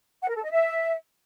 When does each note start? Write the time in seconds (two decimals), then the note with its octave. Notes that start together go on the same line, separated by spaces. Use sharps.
0.21 F#5
0.29 A#4
0.36 A4
0.43 D#5
0.50 E5